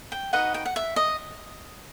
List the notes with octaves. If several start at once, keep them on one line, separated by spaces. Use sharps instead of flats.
G5
D#4 F#4 B4 D#5 F#5
G5
F#5
E5
D#5